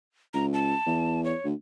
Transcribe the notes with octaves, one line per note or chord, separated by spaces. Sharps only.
C#2 A#5
A5
E2
C#5
D2